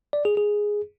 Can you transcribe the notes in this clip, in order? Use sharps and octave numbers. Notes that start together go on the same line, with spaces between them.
D5
G#4
G#4